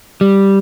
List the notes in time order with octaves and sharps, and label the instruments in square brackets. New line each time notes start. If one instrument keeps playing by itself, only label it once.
[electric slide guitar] G3